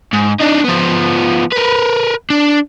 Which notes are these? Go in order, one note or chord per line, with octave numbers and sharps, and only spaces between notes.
G#2
D4 D#4
F3 B3
A#4 B4
D4